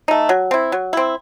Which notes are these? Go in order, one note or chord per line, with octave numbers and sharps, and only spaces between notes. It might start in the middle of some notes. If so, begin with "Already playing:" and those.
A3 D#4
F#3
C4 E4
F#3
C4 E4